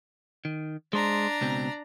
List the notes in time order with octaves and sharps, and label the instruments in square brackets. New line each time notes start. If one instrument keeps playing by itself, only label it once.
[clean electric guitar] D#3
[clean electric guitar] G#3 C5 [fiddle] D4 A#5
[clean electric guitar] C#2 B2 C4